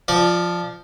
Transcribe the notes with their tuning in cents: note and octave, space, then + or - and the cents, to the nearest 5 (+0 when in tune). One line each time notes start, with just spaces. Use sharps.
F3 +0 D5 +20